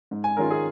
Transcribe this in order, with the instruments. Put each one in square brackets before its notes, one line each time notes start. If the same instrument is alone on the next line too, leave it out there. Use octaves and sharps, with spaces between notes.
[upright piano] G#2
G#5
D#3 G#3 C#4 F4 A#4
G#4